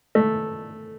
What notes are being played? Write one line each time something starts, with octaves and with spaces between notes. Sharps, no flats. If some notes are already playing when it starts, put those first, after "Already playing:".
A3